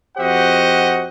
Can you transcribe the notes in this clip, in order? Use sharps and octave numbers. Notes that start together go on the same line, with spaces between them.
F2 F#4 G4 C5 D#5 F#5